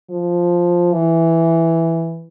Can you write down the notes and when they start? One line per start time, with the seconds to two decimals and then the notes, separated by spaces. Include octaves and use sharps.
0.10 F3
0.93 E3